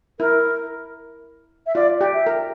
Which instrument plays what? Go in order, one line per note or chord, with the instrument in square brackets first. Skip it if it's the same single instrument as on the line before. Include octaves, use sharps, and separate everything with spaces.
[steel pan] E4 [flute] A#4
[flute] E5
[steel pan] F4 [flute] D5
[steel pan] G4
[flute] E5
[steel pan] A#4